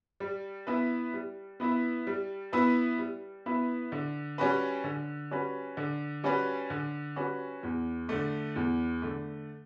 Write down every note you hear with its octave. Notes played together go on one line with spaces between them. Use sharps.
G3
B3 E4 B4 E5
G3
B3 E4 B4 E5
G3
B3 E4 B4 E5
G3
B3 E4 B4 E5
D3
G3 C#4 F#4 B4
D3
G3 C#4 F#4 B4
D3
G3 C#4 F#4 B4
D3
G3 C#4 F#4 B4
E2
D3 A3
E2
D3 A3